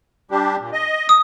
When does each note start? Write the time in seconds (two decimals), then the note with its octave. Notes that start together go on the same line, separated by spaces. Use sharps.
0.31 G3 D4 G4
0.60 A#2
0.73 D#5
1.09 D#6